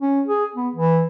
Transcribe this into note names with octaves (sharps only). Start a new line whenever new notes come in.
C#4
G#4
B3
E3